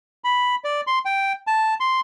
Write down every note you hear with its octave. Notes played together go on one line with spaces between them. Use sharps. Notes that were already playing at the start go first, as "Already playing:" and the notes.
B5
D5
C6
G5
A5
C6